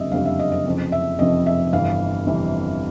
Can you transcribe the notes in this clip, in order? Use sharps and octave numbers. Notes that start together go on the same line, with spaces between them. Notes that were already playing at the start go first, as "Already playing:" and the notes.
Already playing: F#1 F2 D3 G3 C4 D#5 E5
F#1 F2 D3 G3 C4 F5
E5
D#5
D#5
F1 F2 C#3 F3
E5
F1 F2 C#3 F3 D#5
E5
G1 F2 C3 E3 F5
G1 F2 C3 E3